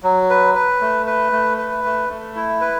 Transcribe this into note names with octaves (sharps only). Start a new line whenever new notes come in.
F#3
B4
B4
A3
B4
A3
B4
A3
A3
E4
B4